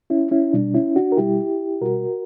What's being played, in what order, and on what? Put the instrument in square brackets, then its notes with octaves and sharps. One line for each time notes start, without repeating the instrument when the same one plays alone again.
[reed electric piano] C#4 E4
C#4 E4
B2 G3 D4
C#4 E4
D4 F#4
A#4
B2 G3 E4 G4
B2 G3 F#4 A#4